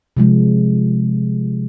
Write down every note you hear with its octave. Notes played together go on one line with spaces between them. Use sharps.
C3 F3 G#3